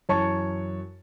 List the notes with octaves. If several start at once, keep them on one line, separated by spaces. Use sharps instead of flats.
F#2 E3 C#5 A5 C#6